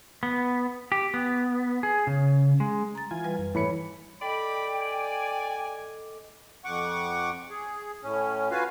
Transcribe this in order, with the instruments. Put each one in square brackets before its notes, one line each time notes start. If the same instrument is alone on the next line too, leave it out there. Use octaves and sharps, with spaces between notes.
[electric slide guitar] B3
G4
B3
G#4
C#3
G#3
[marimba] A#5 A6
[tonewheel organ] E3 F4 G#5
[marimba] G3 B4
[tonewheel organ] F#2
[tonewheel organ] G#2 A3 [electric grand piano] E3 B5 C#7 [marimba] C#5
[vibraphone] A4 D#5 D6 [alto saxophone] D5 [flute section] G5 [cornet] B5
[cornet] G#5
[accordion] F2 F#5 C#6 D6
G#4
A2 C#4
F4 F#4 B4 F5 G#5